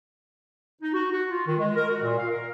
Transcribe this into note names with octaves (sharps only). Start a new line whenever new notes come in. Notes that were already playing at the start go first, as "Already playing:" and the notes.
D#4
F#4
F#4
F4
D#3
G#3
A#4
F#4
A#2
F5
A#4